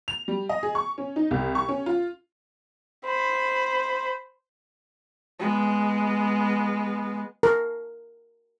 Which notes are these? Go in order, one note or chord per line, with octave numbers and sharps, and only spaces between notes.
F7
G3
D#5
G#4
C#6
C#4
D#4
C2
C#6
C#4
F4
C5 B5
G#3 B3
A#4